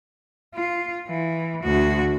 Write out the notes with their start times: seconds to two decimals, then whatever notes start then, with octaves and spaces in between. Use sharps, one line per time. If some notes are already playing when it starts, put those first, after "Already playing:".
0.55 F4
1.08 E3
1.64 D2 F#4